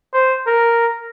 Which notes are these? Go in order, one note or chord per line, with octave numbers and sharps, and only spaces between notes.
C5
A#4